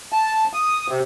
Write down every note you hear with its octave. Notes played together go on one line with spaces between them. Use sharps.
A5
D#6
C3